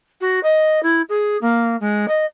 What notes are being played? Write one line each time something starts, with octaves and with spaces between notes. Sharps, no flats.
F#4
D#5
E4
G#4
A#3
G#3
D#5